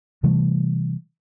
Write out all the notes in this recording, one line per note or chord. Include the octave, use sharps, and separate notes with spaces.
C3 E3 G3 A3